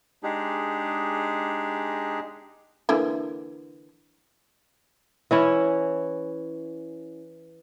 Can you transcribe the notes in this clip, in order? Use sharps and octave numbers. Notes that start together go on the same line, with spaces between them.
G#3 D4 D#4 G4 G#4
D3 E3 A#3
E3 C#4 E4